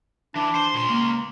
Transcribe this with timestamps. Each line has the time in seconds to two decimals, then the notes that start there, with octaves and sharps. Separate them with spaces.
0.36 E3 D4
0.55 C5
0.74 C#2 A#2 C6
0.89 A#3